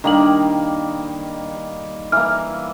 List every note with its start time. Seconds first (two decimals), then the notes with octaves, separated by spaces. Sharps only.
0.04 D#3 G3 A#3 D4 F#7
2.12 E3 A#3 F6